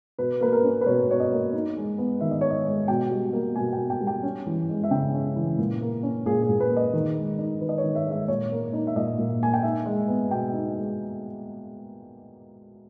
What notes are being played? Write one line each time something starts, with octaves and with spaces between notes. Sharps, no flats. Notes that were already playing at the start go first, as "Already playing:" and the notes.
B2 B4
A#3 B4
A#4
C#4
B4
B2 C#5
B2 C#5
D#5
A#3
D#4
G#3
B3
D#3 E5
D#5
D#4 C#5
D#5
G#3
B2 G5
G3
A#3
B2 G#5
G5
B2
G5
G3
G5
C#4
E3
G#3
E5
C#3 G5
C#4
E3
A#2
A#3
C#4
A#2 G#4
G#4
A#2
B4
A#3
D#5
D#3
G#3
D#4
D#3 B4
D#5
C#5
D#3
E5
G#3
E5
A#2 C#5
A#3
D#4
E5
A#2 D#5
A#2
A#3 G#5
G5
D#4 E5
G#3
B3
B2 G5
D#4
G#3